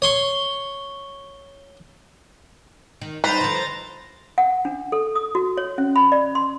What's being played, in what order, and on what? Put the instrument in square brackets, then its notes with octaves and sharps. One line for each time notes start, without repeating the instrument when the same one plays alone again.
[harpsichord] C#5 C6 C#6
[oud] D#3
[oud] G3 C4 D#4 [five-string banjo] B4 [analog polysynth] C5 A#5 A6
[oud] D3 F3
[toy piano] F#5
D4
A4
D#6
F#4
C#5
C#4
B5
D5
C6